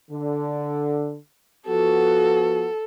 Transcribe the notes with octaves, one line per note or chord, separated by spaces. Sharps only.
D3
F3 B3 F#4 A4